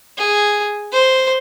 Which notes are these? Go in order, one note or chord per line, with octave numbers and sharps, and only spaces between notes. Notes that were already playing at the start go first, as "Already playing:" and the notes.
G#4
C5